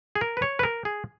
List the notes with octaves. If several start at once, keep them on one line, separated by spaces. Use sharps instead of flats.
G#4
A#4
B4
C#5
B4
A#4
G#4